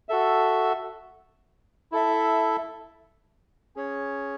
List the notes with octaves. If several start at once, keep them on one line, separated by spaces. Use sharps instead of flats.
F#4 A4 E5
E4 A4 E5
C#4 G#4 C#5